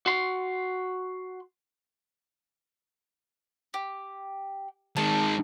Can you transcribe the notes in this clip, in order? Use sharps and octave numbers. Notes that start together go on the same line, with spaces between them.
F#4 C6
G4
D#3 G#3 A5